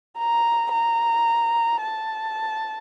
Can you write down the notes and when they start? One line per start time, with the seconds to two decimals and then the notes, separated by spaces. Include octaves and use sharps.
0.18 A#5
0.72 A#5
1.81 A5